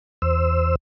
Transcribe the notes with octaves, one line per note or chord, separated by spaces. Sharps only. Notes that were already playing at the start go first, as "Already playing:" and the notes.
E2 C5 E6